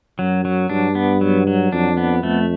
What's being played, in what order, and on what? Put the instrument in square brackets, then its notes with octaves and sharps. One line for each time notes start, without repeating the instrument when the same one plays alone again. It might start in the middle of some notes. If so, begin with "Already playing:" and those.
[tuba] F#2 [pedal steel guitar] F#3
[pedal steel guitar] F#3
[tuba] G2 [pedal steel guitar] D4
[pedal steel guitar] B3
F#3
F#3
[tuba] F2 [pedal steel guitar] D4
[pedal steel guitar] B3
[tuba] F2 [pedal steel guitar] A3